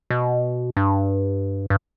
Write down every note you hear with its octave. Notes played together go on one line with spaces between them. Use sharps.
B2
G2
G2